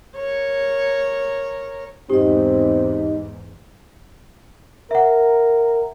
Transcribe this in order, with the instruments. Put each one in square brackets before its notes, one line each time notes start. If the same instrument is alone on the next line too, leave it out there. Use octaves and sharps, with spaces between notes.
[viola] A#4 C#5
[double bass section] E2 G#2 [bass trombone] C4 [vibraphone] D#4 D#5 [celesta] G4
[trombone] A#4 [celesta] E5 F#5